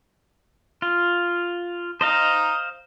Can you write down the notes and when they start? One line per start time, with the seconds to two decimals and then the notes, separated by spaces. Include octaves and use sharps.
0.82 F4
2.01 C5 D#5 F5 A#5 D#6